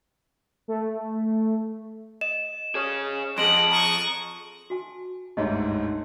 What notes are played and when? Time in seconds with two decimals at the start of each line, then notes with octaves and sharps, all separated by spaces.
0.68 A3
2.21 D#5 E7
2.75 G#4 C#5
3.38 F2 G#4 D#5 F#5 C6 D7 F#7
3.71 A#5 C#6 D#6
4.70 F#4 G#5 A5
5.37 G1 D2 G#2 G#4 C#5 D#5